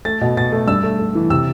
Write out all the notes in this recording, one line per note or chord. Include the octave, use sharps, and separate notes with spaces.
A3 A6
B2
B2 A6
A3
G2 E6
A3
A3
E3
C3 E6